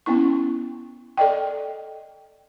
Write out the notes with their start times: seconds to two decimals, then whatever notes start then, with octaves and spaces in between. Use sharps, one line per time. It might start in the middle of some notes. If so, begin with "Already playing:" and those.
0.06 B3 C#4 E4 C#6
1.17 A4 D5 D#5 G5